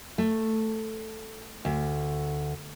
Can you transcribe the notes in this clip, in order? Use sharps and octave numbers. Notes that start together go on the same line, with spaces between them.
A3
D2